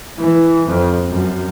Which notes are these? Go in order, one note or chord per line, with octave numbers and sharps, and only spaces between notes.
E3
F2
F#2